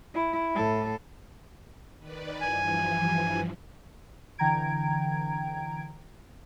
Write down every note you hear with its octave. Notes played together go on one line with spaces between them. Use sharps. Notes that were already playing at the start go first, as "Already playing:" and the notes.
E4
A2 A4
D#3 B4 D5
G2 E3 F3 G#5
D3 E3 G5 A#5 G#6 D7